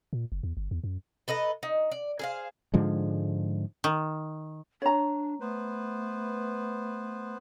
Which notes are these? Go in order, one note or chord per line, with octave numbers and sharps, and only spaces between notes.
A#2
F#1
E2
G1
E2
F#2
A4 B4 D#5 A#5
D#4
D5
G#4 C5 F5
G#2 D3 F3 G#3
D#3
D4 C#5 A#5
A3 B3 B4 C5